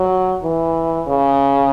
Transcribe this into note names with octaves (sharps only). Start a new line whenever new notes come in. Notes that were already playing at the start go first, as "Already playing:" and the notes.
Already playing: F#3
E3
C#3